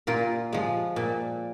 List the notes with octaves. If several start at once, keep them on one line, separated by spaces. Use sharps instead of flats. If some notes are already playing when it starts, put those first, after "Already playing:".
A#2 F4 A#4
F3 G#3
A#2